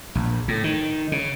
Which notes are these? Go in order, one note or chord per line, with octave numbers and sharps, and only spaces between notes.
A#1
A2
D#3
C#3